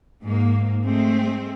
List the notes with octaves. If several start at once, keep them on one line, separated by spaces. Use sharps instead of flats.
G#2 A#3
G#3 A3 C4